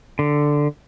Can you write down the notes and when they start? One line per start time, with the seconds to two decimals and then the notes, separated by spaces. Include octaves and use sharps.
0.19 D3